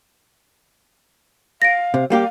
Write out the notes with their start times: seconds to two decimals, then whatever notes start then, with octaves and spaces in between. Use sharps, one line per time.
1.62 F5 A#6 D7
1.94 C3
2.10 G3 A#3 G4 F5